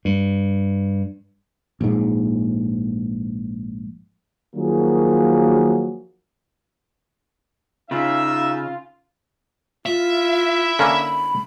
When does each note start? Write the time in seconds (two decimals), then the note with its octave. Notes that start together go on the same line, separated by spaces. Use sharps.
0.05 G2
1.81 A#1 G#2
4.56 D#3 F3 F#3 A#3 F#4 G#4
7.91 C#3 D#4 F4 E5
9.86 E4 F4 E5
10.79 D3 A#3 C#4 B5